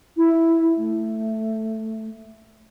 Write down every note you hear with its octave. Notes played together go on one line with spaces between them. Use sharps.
E4
A3